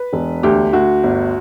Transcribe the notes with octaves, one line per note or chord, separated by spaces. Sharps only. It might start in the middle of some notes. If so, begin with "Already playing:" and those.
Already playing: B4
E1
D2 G4
D2 F#4
G1